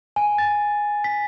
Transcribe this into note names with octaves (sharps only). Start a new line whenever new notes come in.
G#5
A6
B6